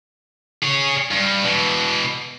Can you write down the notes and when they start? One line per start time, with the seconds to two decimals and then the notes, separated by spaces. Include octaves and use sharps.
0.63 G#4 C#5
1.11 G2
1.45 B2 E3